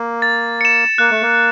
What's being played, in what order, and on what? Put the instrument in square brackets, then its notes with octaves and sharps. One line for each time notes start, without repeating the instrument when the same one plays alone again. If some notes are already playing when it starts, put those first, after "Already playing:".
Already playing: [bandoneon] A#3
[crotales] A6
C#7 E7
[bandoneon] A#3 [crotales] F#6
[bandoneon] A3
A#3